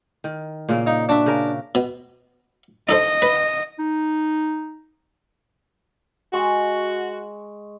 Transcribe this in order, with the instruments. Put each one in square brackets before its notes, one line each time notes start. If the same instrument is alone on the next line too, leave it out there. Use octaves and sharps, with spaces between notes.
[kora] D#3
A#2 C#3 A#3
[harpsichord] D#4
[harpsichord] D4 [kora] F#4 E5
[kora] C#3 A#4
[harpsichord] B2
[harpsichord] D#4 A4 C5 [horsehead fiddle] D#5
[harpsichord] B4
[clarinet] D#4
[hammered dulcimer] G#3 C#6 [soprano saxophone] F#4